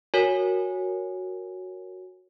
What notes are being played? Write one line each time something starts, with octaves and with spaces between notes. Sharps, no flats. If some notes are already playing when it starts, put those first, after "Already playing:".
F#4 A#4 C#5 G#5